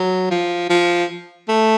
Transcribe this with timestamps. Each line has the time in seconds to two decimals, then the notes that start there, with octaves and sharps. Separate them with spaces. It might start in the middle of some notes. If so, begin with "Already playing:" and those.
Already playing: F#3
0.31 F3
0.69 F3
1.49 A3